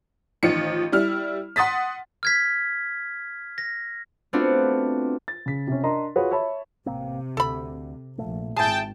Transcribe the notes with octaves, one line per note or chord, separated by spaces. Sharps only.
A1 D#3 F3 C#7
G3 E4 F6
F#5 C6 D#6 A6 B6
F6 G#6 B6
A#6
A3 B3 C4 D4 F4 F#4
A6
C#3 B6
C3 C#4
D4 A#4 D#5 A#5 C6
F4 F#4 G#4 B4 C#5
C#5 E5 A5 B5
A1 C3 A#3 C4
D2 A4 B5
A#1 A#2 A3
G#1 E4 G#4 G5 A5